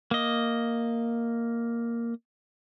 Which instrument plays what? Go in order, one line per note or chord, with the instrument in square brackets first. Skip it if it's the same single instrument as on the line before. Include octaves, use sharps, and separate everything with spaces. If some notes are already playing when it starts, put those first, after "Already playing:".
[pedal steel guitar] A#3 D#5